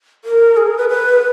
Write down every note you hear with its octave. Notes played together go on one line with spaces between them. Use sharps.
A#4
G#4
A#4
B4
B4